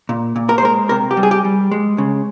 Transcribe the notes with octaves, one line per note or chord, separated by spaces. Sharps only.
A#2
A#2
A#4
C5
G#3 A#4
C3 A#4
G4
G3
G#4
G4
G3
G#3
C#3